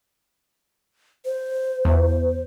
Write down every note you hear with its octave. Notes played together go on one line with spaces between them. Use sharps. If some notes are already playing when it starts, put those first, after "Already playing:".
C5
E2